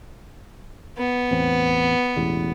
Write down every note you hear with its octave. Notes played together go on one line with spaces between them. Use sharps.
B3
A1 E2 C4
E1 A1 E2